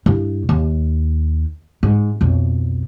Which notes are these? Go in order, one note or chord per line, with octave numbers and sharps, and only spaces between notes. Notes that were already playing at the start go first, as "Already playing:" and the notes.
G2 E4
D#2
G#2
B1 F2